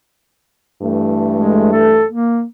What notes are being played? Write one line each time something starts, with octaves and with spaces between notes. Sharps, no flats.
G2 E3 A3
G#3
A4
A#3